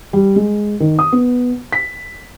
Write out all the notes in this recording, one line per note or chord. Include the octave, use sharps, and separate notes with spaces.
G3
G#3
D#3
D#6
B3
B6